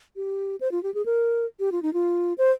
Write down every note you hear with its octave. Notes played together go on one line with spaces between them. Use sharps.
G4
C5
F4
G4
G#4
A#4
G4
F4
D#4
F4
C5